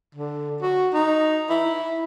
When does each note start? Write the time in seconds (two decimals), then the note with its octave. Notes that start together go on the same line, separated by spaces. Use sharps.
0.15 D3
0.62 F#4
0.94 D#4
1.50 E4